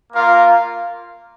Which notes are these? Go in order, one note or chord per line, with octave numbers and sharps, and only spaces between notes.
A#3 F4 A#4 F5